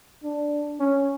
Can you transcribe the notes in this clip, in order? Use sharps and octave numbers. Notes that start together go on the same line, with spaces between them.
D4
C#4